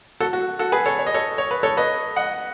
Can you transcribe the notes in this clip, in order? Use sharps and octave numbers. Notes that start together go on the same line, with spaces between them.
F#4 A4
F#4
F#4 A4
G#4 B4
A4 C#5
C#5
D#5
A4 C#5
C#5
B4
A4 C#5
B4 D#5
D#5 F#5